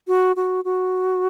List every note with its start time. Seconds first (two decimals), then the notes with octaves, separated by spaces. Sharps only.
0.08 F#4
0.36 F#4
0.64 F#4